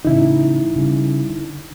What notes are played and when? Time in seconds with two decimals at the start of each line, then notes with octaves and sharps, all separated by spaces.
0.05 A2 C#3 E3 D#4 E4
0.76 C#3 G3
1.30 D3